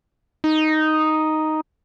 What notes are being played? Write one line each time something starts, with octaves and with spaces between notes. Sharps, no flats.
D#4